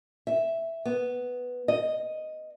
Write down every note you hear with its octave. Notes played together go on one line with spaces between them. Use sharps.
E5
B3
D#5